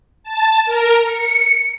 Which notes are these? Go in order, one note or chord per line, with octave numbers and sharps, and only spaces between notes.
A5
A#4
C#7